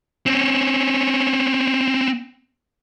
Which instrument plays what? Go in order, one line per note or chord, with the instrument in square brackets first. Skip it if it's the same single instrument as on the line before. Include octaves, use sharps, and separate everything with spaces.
[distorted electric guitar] C4 C#4